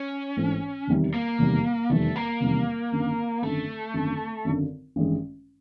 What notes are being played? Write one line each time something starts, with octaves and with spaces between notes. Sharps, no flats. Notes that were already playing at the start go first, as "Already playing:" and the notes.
Already playing: C#4
A1 G#2 E3 A3 C4
F1 E2 C3 D#3 G3
A#3
F1 E2 C3 D#3 G3
F1 E2 C3 D#3 G3 A3
A#3
F1 E2 C3 D#3 G3
G#1 F#2 D3
G#1 F#2 D3 A3
G#1 F#2 D3
G#1 F#2 D3
A1 G2 D#3 G#3